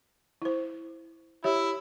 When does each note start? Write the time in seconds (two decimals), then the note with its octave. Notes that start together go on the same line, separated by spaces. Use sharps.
0.42 E4 C5
1.44 E4 G4 C#5 E5